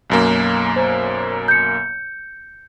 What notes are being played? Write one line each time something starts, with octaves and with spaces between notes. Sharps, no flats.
B1 F#2 A#3
C5
G6 C#7